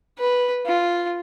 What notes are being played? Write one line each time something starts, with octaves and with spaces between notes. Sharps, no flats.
B4
F4